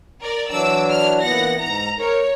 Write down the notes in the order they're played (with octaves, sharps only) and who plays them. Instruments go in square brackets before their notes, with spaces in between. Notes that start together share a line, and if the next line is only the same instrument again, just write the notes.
[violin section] A#4 D5
[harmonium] E3 F#3 D4 [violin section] D6 E6
[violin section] F6
[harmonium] A#2 E3 B3 [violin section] F#5 A#6
[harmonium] G#2 [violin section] A#5
[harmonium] A#4 [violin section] C#5